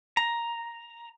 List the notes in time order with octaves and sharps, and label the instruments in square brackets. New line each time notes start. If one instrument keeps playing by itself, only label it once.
[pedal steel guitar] A#5